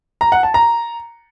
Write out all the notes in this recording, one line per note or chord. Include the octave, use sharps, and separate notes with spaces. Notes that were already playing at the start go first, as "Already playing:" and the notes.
A#5
F#5
A5
A#5